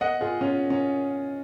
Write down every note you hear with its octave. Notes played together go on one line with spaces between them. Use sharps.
D#5 F#5
F4 G#4
C#4 F4
C#4